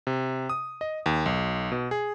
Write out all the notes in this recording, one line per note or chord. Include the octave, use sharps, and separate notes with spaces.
C3
D#6
D#5
D#2
B1
B2
G#4